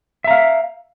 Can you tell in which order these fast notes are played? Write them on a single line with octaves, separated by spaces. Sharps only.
E5 A#5 F5